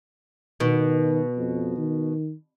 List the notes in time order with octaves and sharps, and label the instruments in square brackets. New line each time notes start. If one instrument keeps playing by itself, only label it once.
[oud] B2 [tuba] D#3
[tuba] F2
D#3